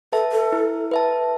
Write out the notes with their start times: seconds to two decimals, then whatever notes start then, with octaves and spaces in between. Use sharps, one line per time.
0.13 A4 B4 E5 A5
0.32 A4
0.52 E4
0.91 B4 E5 A5